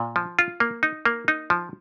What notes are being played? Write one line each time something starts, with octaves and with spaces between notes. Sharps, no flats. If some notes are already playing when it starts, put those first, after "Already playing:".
Already playing: A#2
F3
F4
A#3
D#4
A#3
D#4
F3